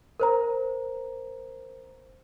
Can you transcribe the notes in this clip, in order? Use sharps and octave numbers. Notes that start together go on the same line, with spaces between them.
A#4 C5 A#5